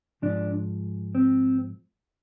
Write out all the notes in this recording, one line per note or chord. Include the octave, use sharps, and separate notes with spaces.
G#2 F3 D4
C4